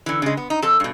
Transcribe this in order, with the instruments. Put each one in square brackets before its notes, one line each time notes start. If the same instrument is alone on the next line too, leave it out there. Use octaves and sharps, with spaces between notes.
[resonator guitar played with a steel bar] D3 E3
C#3 G#3
B3
D#4
F2 A4
G2 B2